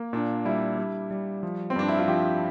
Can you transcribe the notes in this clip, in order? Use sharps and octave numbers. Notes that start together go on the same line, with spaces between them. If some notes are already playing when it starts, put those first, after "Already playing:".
Already playing: A#3
A#2 D4
G3 E4
G3
G3
F3
C4
G2 D4
E4
F4
F3 G4